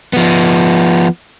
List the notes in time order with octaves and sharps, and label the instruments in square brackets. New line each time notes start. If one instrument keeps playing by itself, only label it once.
[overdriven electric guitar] F3 B3